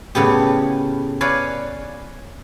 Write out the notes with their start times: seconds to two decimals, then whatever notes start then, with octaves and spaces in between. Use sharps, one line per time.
0.15 A2 C#3 B3 G4
1.21 B4 C#5 D5 F5 G#5